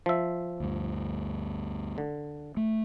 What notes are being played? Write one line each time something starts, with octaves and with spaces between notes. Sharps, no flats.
F3 E5
D2 G2
D3
A3